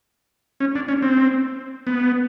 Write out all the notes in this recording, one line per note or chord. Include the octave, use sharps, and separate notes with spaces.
C#4
D4
C#4
C4
B3